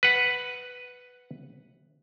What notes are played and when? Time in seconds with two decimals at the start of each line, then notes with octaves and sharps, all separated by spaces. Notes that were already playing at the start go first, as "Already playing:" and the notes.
0.03 B4 F#5